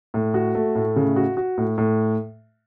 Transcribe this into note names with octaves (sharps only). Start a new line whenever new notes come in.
A2
F#4
A3
A2
C#3
F#4
F#4
A2
A2